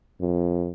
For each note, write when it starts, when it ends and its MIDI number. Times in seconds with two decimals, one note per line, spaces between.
0.21 0.71 41